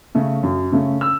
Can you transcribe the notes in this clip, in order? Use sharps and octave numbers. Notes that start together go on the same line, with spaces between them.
C#3 A3 C#4
F#2
C#3 A3 C#4
E6